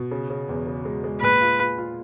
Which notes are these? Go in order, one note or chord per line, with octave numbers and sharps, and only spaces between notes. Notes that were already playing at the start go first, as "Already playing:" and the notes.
Already playing: B2
C#3
C#3
E2
C#3
G#3
G#3
A#2 B4
F4
F4
F4